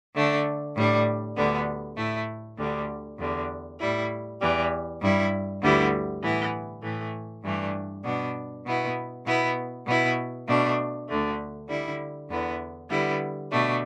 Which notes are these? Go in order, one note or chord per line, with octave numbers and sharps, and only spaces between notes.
D3 A3 D4
A2 G3 D4
D2 D3 G3 B3
A2 A3 E4
D2 D3 G3
E2 D3 G3
A2 G3 E4
E2 E3 G3
G2 G3 E4
D2 D3 G3 B3 E4
A2 E3 B3 E4
A2 E3 A3
G2 E3 A3 D4
B2 B3 D4
B2 B3 E4
B2 B3 E4
B2 B3 E4
B2 A3 D4
D2 D3 A3
D3 G3 E4
E2 D3 B3 E4
D3 G3 B3 E4
B2 A3 D4